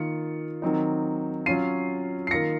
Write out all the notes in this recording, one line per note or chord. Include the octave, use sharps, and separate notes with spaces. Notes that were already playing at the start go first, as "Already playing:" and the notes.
Already playing: D#3 A#3 F4 C#7
D#3 F#3 C4 D#4
F#3 C#4 F4 C7 D#7
C7
D#3 A#3 F4 A#6 C#7